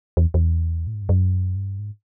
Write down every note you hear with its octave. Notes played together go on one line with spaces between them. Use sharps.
E2
E2
A2
G#2
G2
F#2
G2
G#2